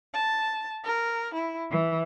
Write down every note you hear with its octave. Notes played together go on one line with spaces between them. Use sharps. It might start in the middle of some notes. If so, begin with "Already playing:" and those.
A5
A#4
E4
E3